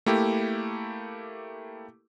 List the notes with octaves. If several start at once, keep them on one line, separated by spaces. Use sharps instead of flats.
A3 A#3 E4 G4